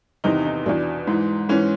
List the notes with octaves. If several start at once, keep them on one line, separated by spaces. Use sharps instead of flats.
E2 C3 D#3 D#4
D#4
E2 B2 D4
G#2 E3
G#2 E3 C#4